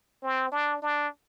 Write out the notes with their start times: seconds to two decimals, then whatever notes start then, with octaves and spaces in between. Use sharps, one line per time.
0.23 C4
0.52 D4
0.82 D4